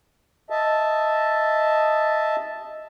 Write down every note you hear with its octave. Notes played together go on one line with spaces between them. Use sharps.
D#5 E5 A5